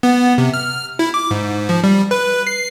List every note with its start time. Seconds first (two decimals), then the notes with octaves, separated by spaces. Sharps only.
0.03 B3
0.38 C3
0.54 F6
0.99 E4
1.14 D6
1.31 G#2
1.69 F3
1.84 G3
2.11 B4
2.47 C7